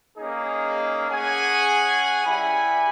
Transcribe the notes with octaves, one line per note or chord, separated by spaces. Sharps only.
A#3 C#4 D#4 G#4
C#4 G#4 F#5 G#5
G3 E4 G#5 B5